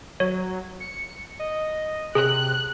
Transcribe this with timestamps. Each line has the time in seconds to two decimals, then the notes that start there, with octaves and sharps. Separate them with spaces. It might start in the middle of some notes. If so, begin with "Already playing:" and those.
0.20 F#3 C#5
0.80 C#7
1.39 D#5
2.15 C3 G#4 F#6